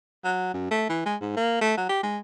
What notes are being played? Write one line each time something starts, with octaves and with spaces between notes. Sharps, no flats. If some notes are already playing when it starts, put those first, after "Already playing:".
F#3
F#2
A3
E3
G#3
G#2
A#3
A3
F#3
G4
G#3